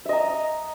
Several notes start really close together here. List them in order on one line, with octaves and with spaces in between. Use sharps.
E5 D#5 A#5